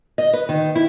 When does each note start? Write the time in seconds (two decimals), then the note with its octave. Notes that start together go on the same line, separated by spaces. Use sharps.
0.18 D#5
0.33 B4
0.49 D#3
0.75 E4